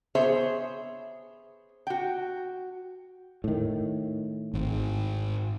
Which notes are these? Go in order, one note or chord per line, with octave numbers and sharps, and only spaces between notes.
B3 G#4 C5 C#5 E5
F#4 G5
A2 D#3
G#1